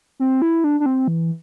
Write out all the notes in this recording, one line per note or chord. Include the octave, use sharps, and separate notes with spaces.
C4
E4
D4
D4
C4
E3